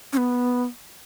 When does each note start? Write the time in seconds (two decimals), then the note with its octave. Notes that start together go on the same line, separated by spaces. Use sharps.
0.13 C#4
0.17 B3